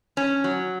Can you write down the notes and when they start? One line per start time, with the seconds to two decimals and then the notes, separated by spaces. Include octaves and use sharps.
0.17 C#4
0.44 F#3